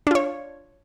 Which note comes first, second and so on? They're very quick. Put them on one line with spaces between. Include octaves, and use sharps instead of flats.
D4 F4 C#5